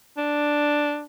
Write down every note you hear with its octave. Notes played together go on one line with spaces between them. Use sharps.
D4